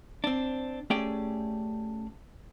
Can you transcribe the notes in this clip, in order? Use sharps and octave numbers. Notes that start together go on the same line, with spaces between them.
C4 D4
A3 C#4 G4 G#4 D5 G5